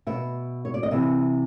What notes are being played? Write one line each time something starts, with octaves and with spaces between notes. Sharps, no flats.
B2 E5
C#5
D5
D#5
C3 E3 E5